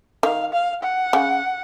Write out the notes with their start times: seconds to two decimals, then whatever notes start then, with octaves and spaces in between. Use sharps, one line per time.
0.23 D#3 F5
0.53 F5
0.83 F#5
1.13 C#3